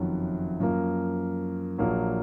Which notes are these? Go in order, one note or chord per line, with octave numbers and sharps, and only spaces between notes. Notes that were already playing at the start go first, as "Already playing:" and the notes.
Already playing: F#1 F2 D#3 F#3
F#2 F3 A#3
A#1 A#2 F#3 A#3